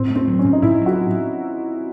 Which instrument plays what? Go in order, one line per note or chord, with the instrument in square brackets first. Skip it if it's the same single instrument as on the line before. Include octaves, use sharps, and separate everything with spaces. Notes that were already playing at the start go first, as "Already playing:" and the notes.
Already playing: [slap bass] A2 [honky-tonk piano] C4
[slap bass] A3
[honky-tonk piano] C4
[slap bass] F#3
[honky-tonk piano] C#4
[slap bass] A2
[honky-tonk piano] D#4
[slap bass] A2 [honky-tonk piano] E4
[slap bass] F#3
[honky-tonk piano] F#4